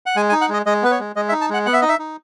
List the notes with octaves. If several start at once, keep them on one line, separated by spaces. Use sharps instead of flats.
F#5
G#3 G#5
G#5
D#4
F#5
G#3 D#5
G#3 D#5
B3 B4
C#5
G#3
G#3 D#5
E5
D#4
A5
G#3 F#5
B3 F#5
E5
D#4 D#5
E5
D#4